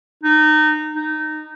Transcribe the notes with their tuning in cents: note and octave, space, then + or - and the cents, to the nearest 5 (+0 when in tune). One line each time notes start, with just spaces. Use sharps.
D#4 -20
D#4 -15